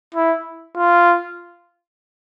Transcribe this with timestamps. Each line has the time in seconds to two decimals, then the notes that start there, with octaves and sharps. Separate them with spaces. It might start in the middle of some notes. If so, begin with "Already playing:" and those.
0.15 E4
0.76 F4